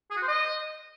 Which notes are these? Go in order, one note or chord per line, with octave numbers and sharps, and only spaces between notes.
G#4
F#4
C5
D#5